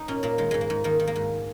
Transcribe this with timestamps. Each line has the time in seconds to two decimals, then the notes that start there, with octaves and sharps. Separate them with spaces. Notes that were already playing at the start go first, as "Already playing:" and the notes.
Already playing: D#4
0.08 A#2 C#4
0.23 A#2 A#3
0.38 D#3 G#3
0.51 G#2 G#3
0.61 A#3
0.70 G#2
0.84 D#3 A#3
1.00 D#3
1.07 A#3
1.16 G#2